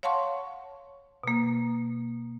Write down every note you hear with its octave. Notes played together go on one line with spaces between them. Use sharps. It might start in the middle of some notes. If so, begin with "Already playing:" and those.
C#5 F5 F#5 A5 C6 C#6
B2 A#3